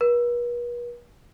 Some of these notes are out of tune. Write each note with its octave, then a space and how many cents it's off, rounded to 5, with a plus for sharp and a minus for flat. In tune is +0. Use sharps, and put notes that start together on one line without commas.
B4 -45